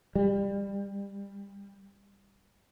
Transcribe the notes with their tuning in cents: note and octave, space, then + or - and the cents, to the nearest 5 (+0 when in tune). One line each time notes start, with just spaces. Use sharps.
G3 +25